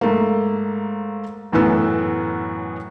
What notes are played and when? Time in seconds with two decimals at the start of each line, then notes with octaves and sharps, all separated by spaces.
0.01 G#2 A3 A#3
1.52 F#2 A2 E3 B3 E6